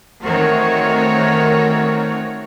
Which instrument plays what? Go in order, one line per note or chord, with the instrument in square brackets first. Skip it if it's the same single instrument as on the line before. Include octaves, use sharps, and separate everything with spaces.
[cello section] D#3 A3 C4 F#4 A#4 C#5